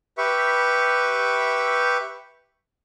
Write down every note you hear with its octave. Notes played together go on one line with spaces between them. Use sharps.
G4 B4 E5 C#6